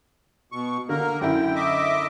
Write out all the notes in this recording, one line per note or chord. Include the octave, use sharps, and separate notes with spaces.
B2 C#6
D3 A#3 A#4
F#2 D3 E4 G5
D#5 E5 D6